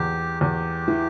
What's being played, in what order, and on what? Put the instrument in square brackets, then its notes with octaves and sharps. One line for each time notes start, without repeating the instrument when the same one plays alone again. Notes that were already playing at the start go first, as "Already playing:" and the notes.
Already playing: [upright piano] E2 [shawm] G4
[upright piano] E2 [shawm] G4
[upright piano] E3